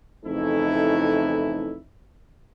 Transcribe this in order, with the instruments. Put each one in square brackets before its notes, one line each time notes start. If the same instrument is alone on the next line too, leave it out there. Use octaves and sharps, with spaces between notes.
[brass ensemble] F2 C#3 E3 A3 D#4 E4